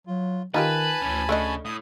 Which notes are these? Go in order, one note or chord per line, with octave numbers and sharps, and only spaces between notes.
F#3 F4
D#3 D#4 F4 G4 B4 G#5 A5 B5
D2 E3 C#4
C#3 A3 D4 D#5
A2 D#6